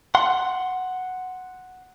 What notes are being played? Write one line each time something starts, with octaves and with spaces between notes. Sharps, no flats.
F#5 C6